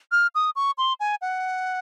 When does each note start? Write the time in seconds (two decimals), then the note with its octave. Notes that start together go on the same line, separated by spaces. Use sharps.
0.12 F6
0.35 D#6
0.56 C#6
0.78 C6
1.00 G#5
1.22 F#5